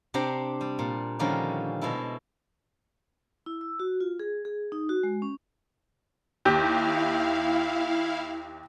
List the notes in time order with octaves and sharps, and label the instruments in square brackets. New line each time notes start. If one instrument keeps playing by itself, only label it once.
[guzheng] C3 D4 G4 C5 G5 A#5
G3
A#2
D3 D#3 F3 G3 A#3 C#4
B2 G#3 E4 A4
[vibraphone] E4
E6
F#4
F4
G#4
G#4
D#4
F#4
G#3
C#4
[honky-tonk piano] D#2 G4 [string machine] E4 F5